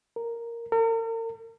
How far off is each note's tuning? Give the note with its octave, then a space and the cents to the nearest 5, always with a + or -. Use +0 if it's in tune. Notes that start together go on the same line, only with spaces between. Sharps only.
A#4 -5
A#4 -45